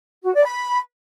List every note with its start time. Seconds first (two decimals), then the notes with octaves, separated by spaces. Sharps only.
0.24 F#4
0.34 D5
0.44 B5